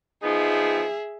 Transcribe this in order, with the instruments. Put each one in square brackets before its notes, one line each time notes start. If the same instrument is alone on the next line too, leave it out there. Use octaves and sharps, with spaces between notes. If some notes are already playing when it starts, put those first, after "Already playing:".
[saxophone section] F3 B3 D#4 [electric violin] G#4 E5